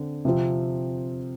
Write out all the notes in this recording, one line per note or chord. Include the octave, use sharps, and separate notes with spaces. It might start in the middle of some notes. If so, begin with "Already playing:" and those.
Already playing: D3 C4
C3 F3 C4